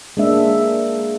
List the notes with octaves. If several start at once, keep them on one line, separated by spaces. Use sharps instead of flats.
G#3 A#3 D4 E5